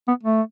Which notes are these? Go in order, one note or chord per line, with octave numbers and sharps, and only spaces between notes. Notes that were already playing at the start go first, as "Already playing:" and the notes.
B3
A3